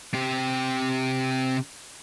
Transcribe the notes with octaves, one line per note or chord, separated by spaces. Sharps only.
C3 G4